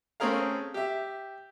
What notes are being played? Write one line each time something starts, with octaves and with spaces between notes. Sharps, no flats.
A3 C4 C#4 G#4 A#4 F5
G4 E5